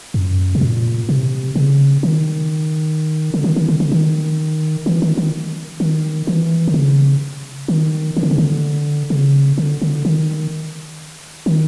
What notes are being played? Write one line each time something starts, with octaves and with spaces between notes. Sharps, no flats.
F#2
B2
A#2
C3
C#3
D#3
D3
D#3
D#3
D3
D3
D#3
E3
D#3
D#3
D#3
E3
D3
C#3
D#3
D#3
D3
C#3
D3
C#3
D3
D3
D#3
D#3